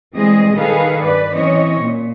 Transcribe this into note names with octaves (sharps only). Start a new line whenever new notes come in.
E3 G3 G#3 C4 G#4 D#5
D#3 G#4 A4 B4 F5
G2 B4 D5
E3 C4 C#4 C#5 D#5
A#2